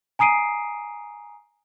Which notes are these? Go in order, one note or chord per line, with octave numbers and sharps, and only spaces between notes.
G#5 A#5 D#6 C7 D7 D#7